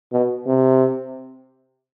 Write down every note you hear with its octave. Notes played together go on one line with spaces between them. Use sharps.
B2
C3